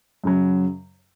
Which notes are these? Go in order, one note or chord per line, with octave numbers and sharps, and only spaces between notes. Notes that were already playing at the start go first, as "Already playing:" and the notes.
F#2 C#3 F#3